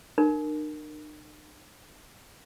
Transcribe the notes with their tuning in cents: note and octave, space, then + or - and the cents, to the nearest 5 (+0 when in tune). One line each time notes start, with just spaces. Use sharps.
D#4 -45 A#4 +0